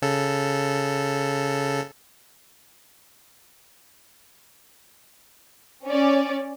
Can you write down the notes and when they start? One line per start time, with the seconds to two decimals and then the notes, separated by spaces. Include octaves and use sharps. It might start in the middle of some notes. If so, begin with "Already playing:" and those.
0.02 C#3 A4
5.86 C#4 D5